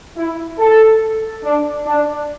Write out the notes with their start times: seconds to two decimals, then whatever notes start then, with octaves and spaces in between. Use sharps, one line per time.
0.17 E4
0.59 A4
1.44 D4
1.86 D4